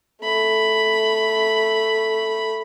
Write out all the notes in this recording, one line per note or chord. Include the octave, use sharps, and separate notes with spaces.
A3 B5